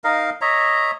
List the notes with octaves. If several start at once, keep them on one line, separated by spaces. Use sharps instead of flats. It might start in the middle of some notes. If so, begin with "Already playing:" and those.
D#4 A#4 D#5 F5
C#5 D#5 E5 A#5